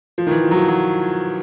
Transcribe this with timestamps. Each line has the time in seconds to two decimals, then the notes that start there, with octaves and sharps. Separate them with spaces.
0.18 F3
0.27 D#3
0.31 E3
0.44 F3
0.51 F#3
0.56 F3
0.68 F#3